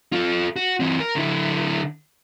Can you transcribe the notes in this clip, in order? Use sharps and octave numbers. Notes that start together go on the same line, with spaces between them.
F4 A4
F#4
E3 C4
A#4
D3 E4